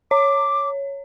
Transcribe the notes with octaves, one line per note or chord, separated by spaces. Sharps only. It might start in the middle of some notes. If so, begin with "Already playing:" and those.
C#5 D6